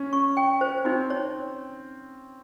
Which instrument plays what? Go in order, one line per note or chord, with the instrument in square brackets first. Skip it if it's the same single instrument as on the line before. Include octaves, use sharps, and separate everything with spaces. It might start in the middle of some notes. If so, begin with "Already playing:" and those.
Already playing: [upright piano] C#4
[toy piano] C#6
G5
C5
[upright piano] C4 [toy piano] D#4
[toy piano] C#5